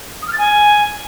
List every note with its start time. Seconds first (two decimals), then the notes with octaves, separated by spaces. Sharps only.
0.22 D#6
0.28 F6
0.33 A6
0.38 G#5